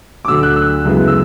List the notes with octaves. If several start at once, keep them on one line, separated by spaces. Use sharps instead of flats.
D6
D2 D3 F#3 E6
F#6
E6
F#2 C#3 G#3 B3 E4
E6